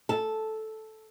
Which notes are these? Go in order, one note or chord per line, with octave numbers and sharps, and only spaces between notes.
A4